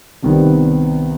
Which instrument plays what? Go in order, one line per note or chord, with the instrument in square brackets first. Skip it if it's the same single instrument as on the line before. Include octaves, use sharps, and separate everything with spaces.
[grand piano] C2 C3 D#3 G3 B3